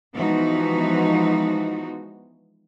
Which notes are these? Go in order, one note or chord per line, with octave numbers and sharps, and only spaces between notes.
E3 F3 G#3 B3 D#4 F#4